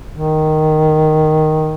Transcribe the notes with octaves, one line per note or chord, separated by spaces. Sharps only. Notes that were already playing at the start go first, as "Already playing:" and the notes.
D#3